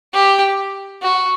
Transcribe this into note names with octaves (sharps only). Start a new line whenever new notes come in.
G4
F#4